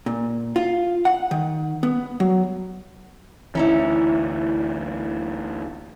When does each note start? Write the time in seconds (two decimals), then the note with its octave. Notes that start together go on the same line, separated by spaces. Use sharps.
0.06 A#2
0.56 F4
1.05 F#5
1.31 D#3
1.83 B3
2.20 F#3
3.55 D2 E3 C#4 D#4 E4